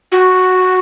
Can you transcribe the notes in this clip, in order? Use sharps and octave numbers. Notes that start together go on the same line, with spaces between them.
F#4